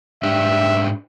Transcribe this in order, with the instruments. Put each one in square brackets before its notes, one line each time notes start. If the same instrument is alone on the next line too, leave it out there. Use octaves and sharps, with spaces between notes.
[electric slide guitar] G#2 D4 G4 [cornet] E5